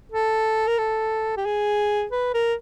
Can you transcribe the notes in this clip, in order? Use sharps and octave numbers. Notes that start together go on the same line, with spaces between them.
A4
A#4
A4
G4
G#4
B4
A#4